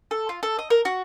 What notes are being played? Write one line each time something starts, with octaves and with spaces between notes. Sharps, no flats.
A4
F4
A4
D#5
A#4
F#4